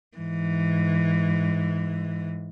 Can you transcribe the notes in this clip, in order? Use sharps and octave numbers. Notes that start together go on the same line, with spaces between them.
G#2 E3